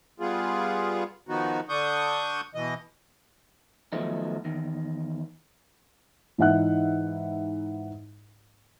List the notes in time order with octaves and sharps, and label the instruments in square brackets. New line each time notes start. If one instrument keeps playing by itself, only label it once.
[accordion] G3 B3 F4 G#4
D#3 F3 B3 D#4 F#4
D3 D4 C#6 D#6 G6
B2 E3 D#5
[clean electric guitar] D#3 F3 F#3 A3 B3 D#4
E2 D#3
[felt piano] G#2 E3 D#4 E5 F#5 F#6